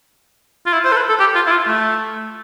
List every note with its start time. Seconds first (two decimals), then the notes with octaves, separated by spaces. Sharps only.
0.66 F4
0.73 E4
0.85 C5
0.92 A4
0.97 B4
1.09 A4
1.20 G4
1.35 F4
1.47 E4
1.51 F4
1.67 A3